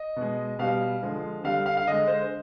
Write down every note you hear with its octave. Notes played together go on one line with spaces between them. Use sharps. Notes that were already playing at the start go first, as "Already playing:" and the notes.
Already playing: D#5
B2 G#3
B2 G3 F5
D3 F3 G#3
D3 G3 F5
F5
F5
D3 G#3 D#5
C5